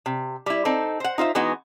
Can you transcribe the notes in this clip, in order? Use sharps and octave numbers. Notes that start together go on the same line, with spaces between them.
C3
G3 E4
C4 D#4 A4
C5 F#5
D#4 F4 C5 E5
E3 G#3 B3 D#4 F#4